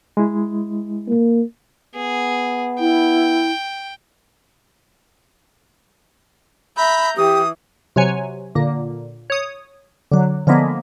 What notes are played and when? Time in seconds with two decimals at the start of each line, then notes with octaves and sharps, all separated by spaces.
0.17 G#3 E4
1.09 A#3
1.95 B3 G#4
2.80 E4 G5
6.77 E5 A#5 B5 G6
7.17 E3 G4 D#6
7.96 C3 F#3 C#5 G#5
8.55 A#2 D3 A#3
9.30 C#5 D#6
10.12 D3 F#3
10.47 D3 F3 G#3 A#3 B3